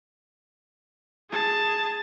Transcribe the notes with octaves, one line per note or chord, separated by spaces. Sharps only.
G#4 A5